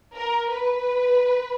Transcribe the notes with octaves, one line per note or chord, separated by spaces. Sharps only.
A#4
B4